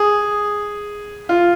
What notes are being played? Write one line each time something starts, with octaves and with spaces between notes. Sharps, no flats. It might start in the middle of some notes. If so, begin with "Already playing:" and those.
Already playing: G#4
F4